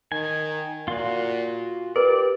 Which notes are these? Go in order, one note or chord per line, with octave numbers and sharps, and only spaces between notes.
D#3 G#5
A#2 F4 F#4
G4 A#4 B4 D5